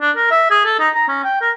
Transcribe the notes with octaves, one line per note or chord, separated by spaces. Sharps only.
D4
A#4
E5
G#4
A4
D#4
A#5
C#4
G5
A#4